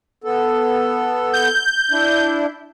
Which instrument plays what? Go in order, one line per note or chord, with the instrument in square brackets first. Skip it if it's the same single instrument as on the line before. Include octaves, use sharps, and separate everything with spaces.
[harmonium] B3 A4
[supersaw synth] G6
[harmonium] D4 E4